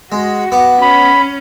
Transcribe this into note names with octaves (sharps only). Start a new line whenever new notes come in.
G#3 F#4
B3 D6
C#4 B5